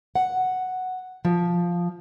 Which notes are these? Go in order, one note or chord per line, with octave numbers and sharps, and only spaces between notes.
F#5
F3